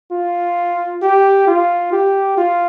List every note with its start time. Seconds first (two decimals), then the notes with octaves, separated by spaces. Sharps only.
0.12 F4
1.02 G4
1.48 F4
1.92 G4
2.38 F4